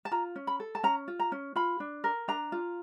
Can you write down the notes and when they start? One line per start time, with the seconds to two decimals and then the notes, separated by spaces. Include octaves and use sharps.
0.05 A5
0.11 F4 A#5
0.36 C#4
0.47 B5
0.60 A4
0.75 A5
0.83 C#4 A#5
1.08 F4
1.20 A#5
1.32 C#4
1.56 F4 B5
1.80 D4
2.04 A#4
2.28 D4 A#5
2.52 F4